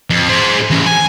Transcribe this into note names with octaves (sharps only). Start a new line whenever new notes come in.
F2
G#4 C5
E3 C#4
G#5